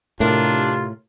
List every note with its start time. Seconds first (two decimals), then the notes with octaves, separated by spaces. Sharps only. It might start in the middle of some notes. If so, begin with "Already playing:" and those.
0.20 A2 C3 D4 F4 A#4